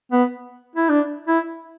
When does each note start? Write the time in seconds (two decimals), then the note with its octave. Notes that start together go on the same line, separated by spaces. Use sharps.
0.12 B3
0.76 E4
0.89 D4
1.27 E4